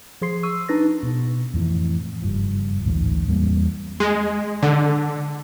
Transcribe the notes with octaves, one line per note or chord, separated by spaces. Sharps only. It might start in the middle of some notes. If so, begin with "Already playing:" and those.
F3 G#4 C6 C7
C#6 E6 D#7
D4 D#4 B4 A6 A#6
B2
F2 A2 E3
F#1 G2 F3
D1 A1 G#2
E2 G3 A#3 C4
G#3
D3